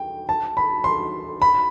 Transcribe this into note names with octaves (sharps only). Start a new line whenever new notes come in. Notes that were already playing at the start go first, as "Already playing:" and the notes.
Already playing: G5
A5
B5
C6
B5